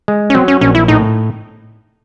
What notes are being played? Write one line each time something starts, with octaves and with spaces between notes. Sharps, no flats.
G#3
C#4
F#3 C4
C#4
A#1 C#4
E4
A2 D#4